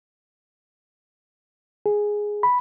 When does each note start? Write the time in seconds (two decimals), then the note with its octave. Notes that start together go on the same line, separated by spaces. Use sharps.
1.86 G#4
2.43 B5